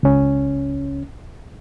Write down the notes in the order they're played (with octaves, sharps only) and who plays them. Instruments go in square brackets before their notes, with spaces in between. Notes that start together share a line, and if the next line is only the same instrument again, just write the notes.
[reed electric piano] C#2 C#4